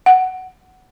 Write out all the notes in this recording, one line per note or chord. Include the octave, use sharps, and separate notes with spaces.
F#5